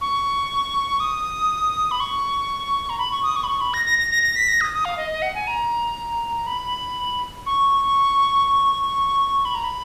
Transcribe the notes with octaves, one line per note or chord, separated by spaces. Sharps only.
C#6
D#6
B5
C#6
A#5
B5
C#6
D#6
C#6
B5
C#6
B5
A#6
A#6
A#6
A#6
A#6
B6
A#6
D#6
D#6
F5
D#5
D#5
F#5
G#5
A#5
B5
C#6
B5
A#5
B5